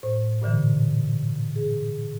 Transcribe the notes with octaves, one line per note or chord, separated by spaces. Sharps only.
A2 C5
G2 A#2 D3 E3
G#4